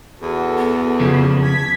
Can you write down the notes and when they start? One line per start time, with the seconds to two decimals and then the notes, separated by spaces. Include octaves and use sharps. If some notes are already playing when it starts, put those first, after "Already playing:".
0.22 E2 F#4 A4
0.58 B3
0.99 F2 C#3 F3
1.44 G#6 B6